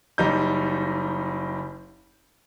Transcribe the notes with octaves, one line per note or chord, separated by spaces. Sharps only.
F#1 G3 D#4 G6